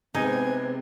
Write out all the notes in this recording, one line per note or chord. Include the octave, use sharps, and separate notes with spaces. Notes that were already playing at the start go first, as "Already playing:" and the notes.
C3 G#3 B3 C4 D#4 G#5